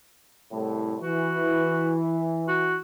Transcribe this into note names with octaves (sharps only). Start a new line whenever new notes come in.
C2 A2
E3 F#4
F#4